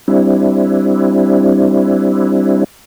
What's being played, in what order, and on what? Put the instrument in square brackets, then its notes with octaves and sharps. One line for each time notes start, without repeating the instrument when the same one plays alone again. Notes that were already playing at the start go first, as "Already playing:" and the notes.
[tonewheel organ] G3 C4 D4 E4